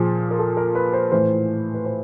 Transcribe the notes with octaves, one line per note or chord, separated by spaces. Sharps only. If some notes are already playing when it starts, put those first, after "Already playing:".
Already playing: A#2 F3 G#4
A#4
A4
A#4
B4
C5
A2 E3 C5
B4
C5